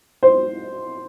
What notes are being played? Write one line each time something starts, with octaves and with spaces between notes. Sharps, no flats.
C5